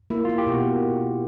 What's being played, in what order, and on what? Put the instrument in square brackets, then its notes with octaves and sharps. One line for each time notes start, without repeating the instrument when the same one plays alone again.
[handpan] A#3 [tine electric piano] E4
[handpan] A#3 [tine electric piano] F4
[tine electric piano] G4
[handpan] B2
[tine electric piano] F#4